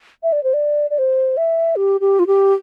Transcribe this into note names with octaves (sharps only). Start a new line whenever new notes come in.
E5
D5
C5
D5
D5
C5
E5
G4
G4
F4
G4